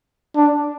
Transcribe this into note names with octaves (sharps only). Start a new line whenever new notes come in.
D4